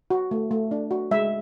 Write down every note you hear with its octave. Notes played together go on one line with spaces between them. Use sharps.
F#4
A3
A3
D4
F#4
G#3 E5